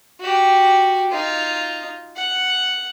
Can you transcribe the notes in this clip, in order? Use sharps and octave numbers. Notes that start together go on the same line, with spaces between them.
F#4 G4
D#4 F4
F#5